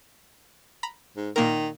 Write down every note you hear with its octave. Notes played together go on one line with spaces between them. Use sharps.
A#5 B5
G#2
A#2 D#3 A#3 A#4